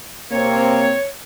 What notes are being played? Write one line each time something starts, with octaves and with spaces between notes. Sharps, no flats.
C3 A#3 C4 C#5